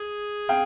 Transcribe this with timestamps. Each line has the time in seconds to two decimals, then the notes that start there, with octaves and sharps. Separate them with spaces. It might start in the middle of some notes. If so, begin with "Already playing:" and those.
Already playing: G#4
0.49 F5 G5